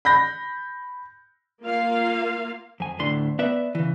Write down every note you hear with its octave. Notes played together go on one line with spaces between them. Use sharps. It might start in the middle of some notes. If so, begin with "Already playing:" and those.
B5 G6 A#6
A#3 F4 F5
F2 G#5
D2 A2 A3 D4 C6
B3 B4 D5 E5
C#3 E3